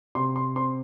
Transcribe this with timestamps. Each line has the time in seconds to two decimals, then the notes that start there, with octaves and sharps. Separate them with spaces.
0.15 C3 C6
0.36 C6
0.56 C4 C6